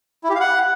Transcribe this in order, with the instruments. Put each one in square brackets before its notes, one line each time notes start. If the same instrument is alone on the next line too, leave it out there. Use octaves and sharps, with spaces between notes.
[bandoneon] E4
G4
F5
F#5